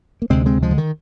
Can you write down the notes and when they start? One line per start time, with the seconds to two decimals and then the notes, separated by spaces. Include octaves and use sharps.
0.22 A#3
0.30 D2 C3 G#3 C4
0.46 G#3 C4
0.63 F3 G#3
0.71 D3
0.78 D#3